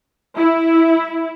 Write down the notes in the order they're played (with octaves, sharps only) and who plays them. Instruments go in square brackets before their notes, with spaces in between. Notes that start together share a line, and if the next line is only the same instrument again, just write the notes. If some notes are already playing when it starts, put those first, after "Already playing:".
[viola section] E4